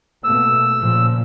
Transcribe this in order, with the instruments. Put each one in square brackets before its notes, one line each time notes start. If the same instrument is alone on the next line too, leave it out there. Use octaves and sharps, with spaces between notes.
[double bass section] B2 A3 A#3 [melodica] E6
[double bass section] A#2 C#3 F3